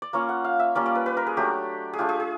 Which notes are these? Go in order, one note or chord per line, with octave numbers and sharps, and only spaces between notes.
D5
A#3 C#4 F4 C#5
F#5
F5
E5
G3 A#3 C#4 F4 D5
D5
B4
B4
A#4
G#4
F#3 A3 D4 G4
G#4
A3 D4 F4 G4
G#4
G#4